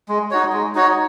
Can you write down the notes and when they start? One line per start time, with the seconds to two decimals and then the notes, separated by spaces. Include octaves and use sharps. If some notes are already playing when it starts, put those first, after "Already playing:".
0.09 G#3
0.31 D#4 F#4 C#5
0.53 G#3
0.75 D#4 F#4 C#5